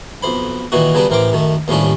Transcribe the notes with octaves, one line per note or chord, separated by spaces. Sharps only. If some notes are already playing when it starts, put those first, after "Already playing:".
B1 F2 C5 B5
A#2 D#3 E3 A#3 D#4 F#4
C#3 F#3 G3 B3 D4
A1 E3 A#4 C5 G5 D6
F#2 D#3 A3
D#2 A2 F3 G3 C#4 D4